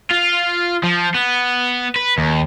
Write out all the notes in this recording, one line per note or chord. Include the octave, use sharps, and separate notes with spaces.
F4
F3
B3
B4
D#2